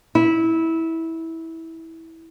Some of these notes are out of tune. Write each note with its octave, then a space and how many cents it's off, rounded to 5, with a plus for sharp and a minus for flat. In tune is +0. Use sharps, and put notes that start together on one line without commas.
E4 -15